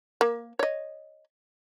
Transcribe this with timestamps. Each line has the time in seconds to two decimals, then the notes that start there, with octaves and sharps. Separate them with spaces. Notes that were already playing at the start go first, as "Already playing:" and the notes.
0.21 A#3
0.59 C#5 D#5